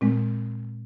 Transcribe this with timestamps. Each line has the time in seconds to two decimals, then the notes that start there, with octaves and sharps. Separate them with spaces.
0.01 A#2 G#3 C4